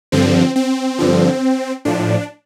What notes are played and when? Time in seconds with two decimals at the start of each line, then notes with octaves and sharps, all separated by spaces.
0.12 G2 D3 F3 C4
0.56 C4
0.99 G2 D3 F3
1.85 A2 F3 D4